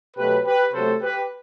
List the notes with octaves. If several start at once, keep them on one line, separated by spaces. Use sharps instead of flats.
B2 F#3 A3 G4 B4
G4 B4
C3 F#3 A3 A4 C5
G4 B4